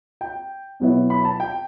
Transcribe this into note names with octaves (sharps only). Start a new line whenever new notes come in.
G5
B2 F#3 B3 E4
B5
A5
G5